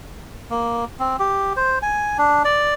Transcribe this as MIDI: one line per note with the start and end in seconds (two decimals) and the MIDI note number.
0.50 0.85 58
0.99 1.17 60
1.20 1.53 67
1.56 1.79 72
1.82 2.17 80
2.18 2.43 62
2.45 2.74 74